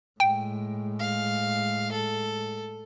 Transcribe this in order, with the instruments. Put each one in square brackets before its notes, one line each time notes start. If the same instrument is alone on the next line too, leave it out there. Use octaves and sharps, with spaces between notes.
[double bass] A2 G#3 [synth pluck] G5
[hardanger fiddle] F5
A4